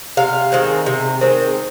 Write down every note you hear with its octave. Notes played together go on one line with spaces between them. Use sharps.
C3 F5
D#3 G#3 C4
C3
D#3 G#3 C4